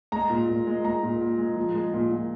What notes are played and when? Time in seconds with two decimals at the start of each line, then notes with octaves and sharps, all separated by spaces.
0.12 G#3 A#5
0.30 A#2
0.48 A#2
0.67 G#3
0.84 G#3 A#5
1.03 A#2
1.21 A#2
1.38 G#3
1.56 F3
1.75 G#3
1.94 A#2
2.11 A#2